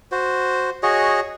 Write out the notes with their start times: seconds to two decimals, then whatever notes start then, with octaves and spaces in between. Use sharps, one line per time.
0.12 F#4 C5
0.83 F#4 G#4 C#5 D#5